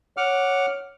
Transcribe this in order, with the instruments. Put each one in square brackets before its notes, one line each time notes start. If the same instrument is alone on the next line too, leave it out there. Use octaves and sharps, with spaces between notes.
[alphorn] C#5 [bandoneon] F#5 D6 F6